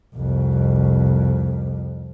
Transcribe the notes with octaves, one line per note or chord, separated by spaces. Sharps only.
C2 F2